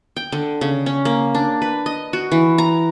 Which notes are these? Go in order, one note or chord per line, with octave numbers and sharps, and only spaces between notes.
G5
D3
C#3
C#4
A#3
D4
B4
D#5
F#4
E3
A#5